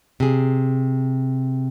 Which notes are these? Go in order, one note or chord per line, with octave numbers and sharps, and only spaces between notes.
C3 G#4